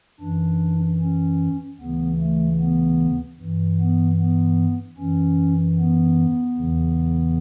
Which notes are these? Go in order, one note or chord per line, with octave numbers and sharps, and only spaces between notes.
F#2 E3 D4
C#4
D2 C#3 E3 B3
A3
B3
G2 E3
B3
B3
F#2 E3 C#4
B3
E2 C#3 E3